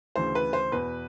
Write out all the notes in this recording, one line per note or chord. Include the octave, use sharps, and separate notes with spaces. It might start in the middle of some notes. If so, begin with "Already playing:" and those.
D2 C#3 E3 C5
B4
C5
E2 B2 B4